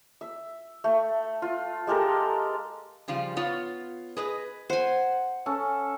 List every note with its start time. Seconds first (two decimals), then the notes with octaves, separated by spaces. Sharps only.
0.21 E5
0.84 A3
1.42 F4
1.87 G#3 G4 A4 A#4
3.08 C#3 F3 G3 F4
3.36 B3 F4 C#5
4.17 G#4 B4 D#5
4.70 C5 F#5 G#5
5.46 C#4 A4